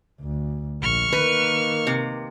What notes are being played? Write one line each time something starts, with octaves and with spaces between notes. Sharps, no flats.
D2
A#1 C#6 F6
D#3 A#3 B4
C3